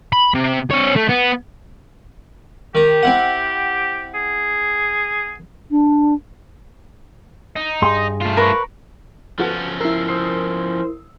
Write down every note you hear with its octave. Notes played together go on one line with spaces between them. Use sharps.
B5
C3
C4 C#5
A3
B3
D#3 G4 A#5
C4 E4 F#5
G#4
D4
D#4
G2 G#4 C6
A3 F4
A#4 B4 C#5
F3 B3 C#4 F#4 A4
E4 A#4 E6 C7
C5 D#6 E6 C7